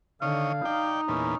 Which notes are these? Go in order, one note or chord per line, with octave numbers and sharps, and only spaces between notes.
D3 D#3 C#5 F5 D#6
D#4 D5 G5
E2 A#2 B3 C#4